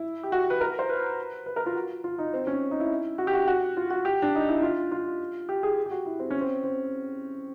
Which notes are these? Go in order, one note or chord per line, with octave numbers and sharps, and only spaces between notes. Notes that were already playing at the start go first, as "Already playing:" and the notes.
Already playing: E4
G4
F#4
B4
A#4
C5
B4
B4
A#4
F4
F#4
F4
D#4
C4
C#4
D#4
E4
F#4
G4
F#4
F#4
F4
F#4
G4
D4
D#4
E4
F4
F4
G4
G#4
G4
F#4
E4
C4
C#4
C4
C4